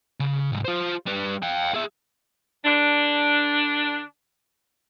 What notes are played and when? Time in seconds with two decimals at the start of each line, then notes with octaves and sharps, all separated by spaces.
0.20 C#3
0.52 C2 G#2
0.65 F4 C5
1.06 G3 B4
1.43 F5 G5
1.74 G#4 E5
2.64 D3 D4